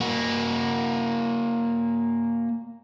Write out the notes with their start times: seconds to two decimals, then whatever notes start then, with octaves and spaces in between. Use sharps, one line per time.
0.01 A#3 F#4